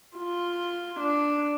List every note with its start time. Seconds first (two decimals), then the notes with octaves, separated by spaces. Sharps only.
0.17 F4
1.00 D4